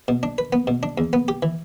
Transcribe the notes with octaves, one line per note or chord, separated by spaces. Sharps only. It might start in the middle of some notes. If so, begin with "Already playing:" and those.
B2
D4
B4
B3
B2
D4
E2
B3
G4
E3